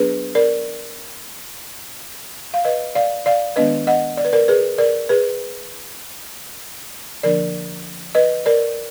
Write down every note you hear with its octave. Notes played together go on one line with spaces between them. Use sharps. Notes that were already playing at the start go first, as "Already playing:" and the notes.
Already playing: F#3 B3 D4 G#4 B4
A#4 D5
F5
B4 D#5
D5 F5
D5 F5
D#3 G#3 B3 D4 B4 D#5
D#5 F#5
D5
B4
A#4 D5
G#4 B4
A#4 D5
G#4 B4
D3 F3 A#3 D4 A#4 D5
B4 D#5
A#4 D5